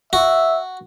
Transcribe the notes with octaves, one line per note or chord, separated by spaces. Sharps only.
F#4 E5